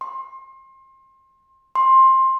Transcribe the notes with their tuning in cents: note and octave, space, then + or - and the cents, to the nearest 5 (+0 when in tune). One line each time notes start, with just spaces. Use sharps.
C6 +30
C6 +15